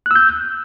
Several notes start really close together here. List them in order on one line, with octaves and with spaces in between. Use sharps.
F#6 E6 G6